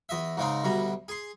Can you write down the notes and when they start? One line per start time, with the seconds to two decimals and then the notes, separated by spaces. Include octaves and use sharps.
0.09 E2 D#5 E5
0.37 G#2 C#3 G#3 C4 D#4
0.64 D2 B2 G3 A#5
1.08 G#4 C6